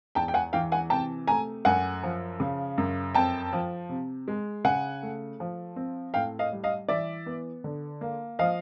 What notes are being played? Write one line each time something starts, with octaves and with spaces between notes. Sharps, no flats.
E2 G5 A5
G5
F#5 G#5
E3 F5 G5
F#5 G#5
C3 G5 A5
A3 G#5 A#5
F#2 F#5 G#5
F3
C#3
F#2
F2 G5 A5
F3
C3
G#3
C#3 F#5 G#5
A3
F3
C4
A2 F5 G5
D#5 F5
G3
D#5 F5
E3 D5 E5
B3
D3
A#3
F3 D#5 F5